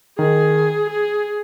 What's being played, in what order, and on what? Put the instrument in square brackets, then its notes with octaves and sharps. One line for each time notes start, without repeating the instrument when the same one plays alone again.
[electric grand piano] D#3 [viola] G#4
[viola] G#4